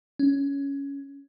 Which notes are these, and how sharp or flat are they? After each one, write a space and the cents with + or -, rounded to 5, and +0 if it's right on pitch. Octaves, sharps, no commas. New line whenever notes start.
C#4 +10